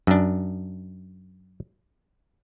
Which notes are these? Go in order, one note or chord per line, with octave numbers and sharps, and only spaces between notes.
F#2 D4